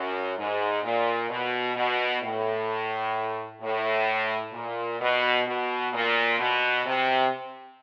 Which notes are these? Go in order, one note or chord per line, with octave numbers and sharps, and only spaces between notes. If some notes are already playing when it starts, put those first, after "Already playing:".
Already playing: F#2
G#2
A#2
B2
B2
A2
A2
A#2
B2
B2
A#2
B2
C3